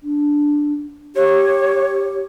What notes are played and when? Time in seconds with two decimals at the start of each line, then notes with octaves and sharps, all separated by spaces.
0.03 D4
1.16 G4 C#5